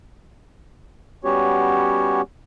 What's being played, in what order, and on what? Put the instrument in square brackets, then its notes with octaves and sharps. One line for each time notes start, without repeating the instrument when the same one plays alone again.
[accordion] G3 B3 C#4 F#4 G4 C#5